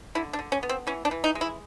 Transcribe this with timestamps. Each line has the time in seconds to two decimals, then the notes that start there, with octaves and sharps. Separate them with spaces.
0.15 D3 E4
0.33 D4
0.39 D3
0.52 C#4
0.63 B3
0.69 C4
0.87 E3 C#4
1.05 D4
1.11 E3
1.24 D#4
1.35 G#3
1.41 E4